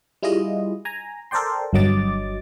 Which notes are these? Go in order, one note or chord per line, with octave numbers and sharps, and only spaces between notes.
G3 E4 F4 G#4 D#5
G#5 A#5
A4 A#4 C5 D5 G5 C6
G1 G2 F#3 D#5 D6 A6